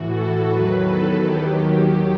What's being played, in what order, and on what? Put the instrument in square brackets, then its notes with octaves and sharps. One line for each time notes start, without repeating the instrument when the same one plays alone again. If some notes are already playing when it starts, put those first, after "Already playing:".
Already playing: [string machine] A2 E3 F#4
A4
E2 D#3 F#3 B4
A4
D#2 D#3 F#3 G4